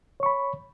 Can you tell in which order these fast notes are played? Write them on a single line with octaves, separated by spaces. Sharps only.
C#5 C#6 B5